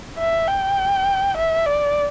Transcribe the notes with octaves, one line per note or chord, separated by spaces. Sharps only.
E5
G5
E5
D5